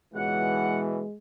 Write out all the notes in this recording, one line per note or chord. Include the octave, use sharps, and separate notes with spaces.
C#2 B2 E3 G#3 F#5